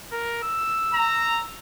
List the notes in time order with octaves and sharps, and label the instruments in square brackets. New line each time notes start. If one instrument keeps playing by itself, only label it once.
[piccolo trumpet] A#4
E6
[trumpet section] A#5